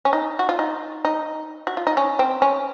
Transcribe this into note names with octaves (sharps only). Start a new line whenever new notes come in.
C#4
D#4
F#4
F4
D#4
D#4
F#4
F4
D#4
C#4
C4
C#4